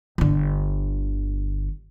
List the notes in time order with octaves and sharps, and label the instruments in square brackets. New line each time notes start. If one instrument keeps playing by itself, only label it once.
[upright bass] G1 D3